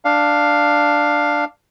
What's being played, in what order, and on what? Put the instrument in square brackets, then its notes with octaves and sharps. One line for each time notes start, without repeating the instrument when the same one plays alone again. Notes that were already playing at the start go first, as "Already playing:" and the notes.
[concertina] D4 F5